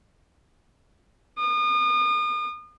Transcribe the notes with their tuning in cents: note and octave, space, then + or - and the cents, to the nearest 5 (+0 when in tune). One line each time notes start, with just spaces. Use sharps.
D#6 -40